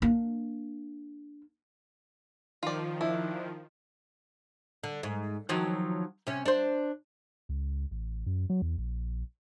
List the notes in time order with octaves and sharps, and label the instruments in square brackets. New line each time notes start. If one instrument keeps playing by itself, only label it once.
[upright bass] A#3 D4
[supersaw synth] D#3 F3 [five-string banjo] F4 D5
[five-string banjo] D4 [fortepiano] E4
[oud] D3
G#2
D#3 F3 F#3
C3 C#4
D4 C5
[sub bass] C#2
A1
F#2
F#3
E2
A#1